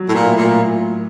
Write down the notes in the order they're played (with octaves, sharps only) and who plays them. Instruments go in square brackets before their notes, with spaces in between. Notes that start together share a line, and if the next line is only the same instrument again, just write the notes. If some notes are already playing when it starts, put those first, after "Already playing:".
Already playing: [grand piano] F#3
[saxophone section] A2
A#2
[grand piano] A2
[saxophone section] A#2